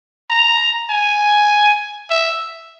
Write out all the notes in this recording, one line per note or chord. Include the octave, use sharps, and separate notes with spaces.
A#5
G#5
E5